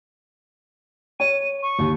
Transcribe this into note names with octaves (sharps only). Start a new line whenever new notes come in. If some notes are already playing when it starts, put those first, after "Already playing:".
C#5 D#7
C#6
D#2